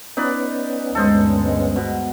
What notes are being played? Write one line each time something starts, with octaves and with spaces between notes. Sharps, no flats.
B3 C#4 D#4 B4 D5
D2 G2 G#3 A4 C5 D#5
B2